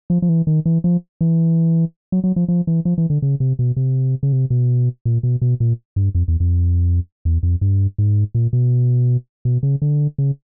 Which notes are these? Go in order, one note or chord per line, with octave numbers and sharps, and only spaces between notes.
F3
F3
E3
D#3
E3
F3
E3
F#3
F#3
F3
F3
E3
F3
E3
D3
C#3
C3
B2
C3
C#3
C3
B2
A#2
B2
B2
A#2
G2
F2
E2
F2
E2
F2
G2
G#2
A#2
B2
B2
C#3
D3
C#3